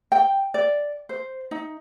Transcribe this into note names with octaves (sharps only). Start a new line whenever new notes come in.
G5
D5
C5
D#4